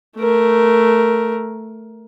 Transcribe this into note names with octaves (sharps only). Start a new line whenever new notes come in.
A3 A#4